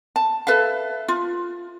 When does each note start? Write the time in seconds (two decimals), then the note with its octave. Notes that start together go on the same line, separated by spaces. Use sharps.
0.16 A5
0.47 A4 B4 E5 F5
1.08 F4